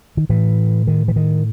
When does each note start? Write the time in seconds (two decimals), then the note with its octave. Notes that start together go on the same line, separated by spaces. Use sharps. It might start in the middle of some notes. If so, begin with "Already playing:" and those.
0.17 D#3
0.29 A2 E3
0.87 D#3
1.08 E3
1.16 D#3